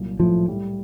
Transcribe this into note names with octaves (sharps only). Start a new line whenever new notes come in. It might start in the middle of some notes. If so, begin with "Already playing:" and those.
Already playing: C2 A#2 F#3
A2 F3
G3